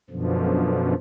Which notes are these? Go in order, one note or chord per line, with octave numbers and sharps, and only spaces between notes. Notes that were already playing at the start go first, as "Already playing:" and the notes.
F#2 B2 D3 F3